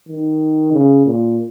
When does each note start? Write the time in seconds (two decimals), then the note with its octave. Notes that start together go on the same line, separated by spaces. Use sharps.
0.08 D#3
0.72 C#3
1.05 A#2